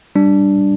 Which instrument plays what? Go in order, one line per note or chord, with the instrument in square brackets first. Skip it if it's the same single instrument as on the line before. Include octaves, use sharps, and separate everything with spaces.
[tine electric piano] G3 D4